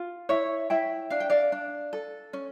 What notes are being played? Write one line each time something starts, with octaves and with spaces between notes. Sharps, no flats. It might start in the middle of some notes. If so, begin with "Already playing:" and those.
Already playing: F4
E4 C#5 E5
E4 E5 G5
D4 F5
G5
D5 F5
D4
A4
C#4